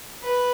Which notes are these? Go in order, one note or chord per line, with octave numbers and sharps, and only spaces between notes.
B4